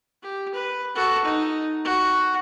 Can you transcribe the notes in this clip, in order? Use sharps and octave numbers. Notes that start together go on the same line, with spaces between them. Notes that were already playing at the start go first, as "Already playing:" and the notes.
G4
B4
F#4 A4
D#4
F#4